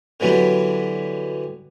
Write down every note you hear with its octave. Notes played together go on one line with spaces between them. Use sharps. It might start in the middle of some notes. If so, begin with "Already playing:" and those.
D3 E3 F#3 G3 B3